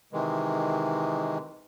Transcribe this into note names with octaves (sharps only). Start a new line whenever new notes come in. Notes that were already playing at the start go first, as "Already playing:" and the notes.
C3 D#3 E3 G#3